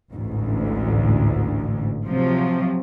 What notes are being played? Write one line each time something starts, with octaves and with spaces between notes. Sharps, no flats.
A1 D2 G#2
C3 F3 F#3